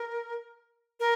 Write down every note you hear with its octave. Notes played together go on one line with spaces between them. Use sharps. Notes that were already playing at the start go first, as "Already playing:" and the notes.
Already playing: A#4
A#4